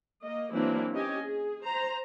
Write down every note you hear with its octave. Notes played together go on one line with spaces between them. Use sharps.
A#3 D#5
E3 F#3 A#3 C4 D4 E4
C#4 G4 D#5 G#5
G#4
C5 A#5